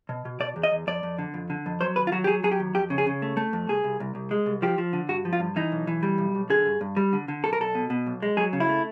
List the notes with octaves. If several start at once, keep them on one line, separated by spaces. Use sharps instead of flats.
B2
B2
B2 D5
E2
D#5
E2
F2 D5
F2
D3
F2
D3
F2
F#3 C5
D#2 B4
F4
F#3 F#4
G4
F#3 G#4
F#3 G#4
G4
D#2
F2 G4
C#3
G#4
C#3
A3
A3
F2
C2 G#4
C2
C2
C2
G#3
C2
F3 G4
F3
D3
G2 F#4
F3
F4
G2
E3 D#4
B1
E3
G3
B1
B1
D3 G#4
G2
G2
G3
D3
D3
B1 A4
A#4
B1 A4
B2
B2
B1
G#3
F#3 G#4
C#3
E4
A3